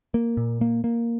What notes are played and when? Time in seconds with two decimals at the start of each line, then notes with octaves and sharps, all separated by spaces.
0.14 A#3
0.37 A#2
0.61 A#3
0.84 A#3